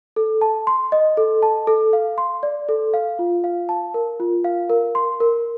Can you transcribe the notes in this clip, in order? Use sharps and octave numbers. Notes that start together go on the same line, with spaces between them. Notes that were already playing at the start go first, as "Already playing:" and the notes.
A4
A5
C6
D#5
A4
A5
A4
F5
C6
D5
A4
F5
F4
F5
A5
A#4
F4
F5
A#4
C6
A#4